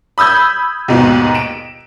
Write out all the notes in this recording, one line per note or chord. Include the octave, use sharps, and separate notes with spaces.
B5 D#6 E6 G6 G#6
D#2 G#2 B2
D7 E7